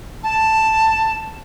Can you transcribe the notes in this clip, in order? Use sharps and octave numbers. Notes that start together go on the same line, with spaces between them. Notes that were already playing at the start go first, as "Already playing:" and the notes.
A5